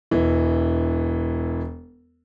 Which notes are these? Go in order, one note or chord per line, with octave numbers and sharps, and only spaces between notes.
E1 E3